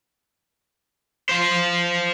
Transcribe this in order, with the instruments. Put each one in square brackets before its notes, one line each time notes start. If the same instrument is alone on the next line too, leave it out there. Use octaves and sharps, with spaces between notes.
[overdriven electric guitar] C5 F5